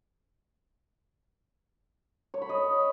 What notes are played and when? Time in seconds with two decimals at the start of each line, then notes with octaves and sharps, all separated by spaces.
2.34 C#5
2.42 B5
2.49 D#5